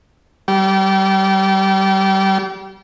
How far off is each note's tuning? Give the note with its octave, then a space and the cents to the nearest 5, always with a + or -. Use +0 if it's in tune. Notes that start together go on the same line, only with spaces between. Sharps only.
G3 -25